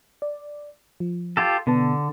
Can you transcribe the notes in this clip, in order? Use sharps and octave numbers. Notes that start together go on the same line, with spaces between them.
D5
F3
F4 G4 A4
B2 D3 B3 A5